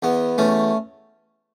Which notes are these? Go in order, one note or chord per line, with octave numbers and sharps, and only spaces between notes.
E2 B3
E2 A3 C#4